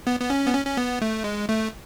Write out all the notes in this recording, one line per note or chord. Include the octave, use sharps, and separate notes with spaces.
B3
B3
C#4
B3
C#4
C#4
B3
A3
G#3
A3